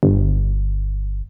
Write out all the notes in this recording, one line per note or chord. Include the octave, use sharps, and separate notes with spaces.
G1